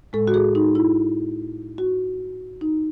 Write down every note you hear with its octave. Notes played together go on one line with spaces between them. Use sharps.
A2 G#3 A4
F#4
G#4
D#4
E4
F#4
D#4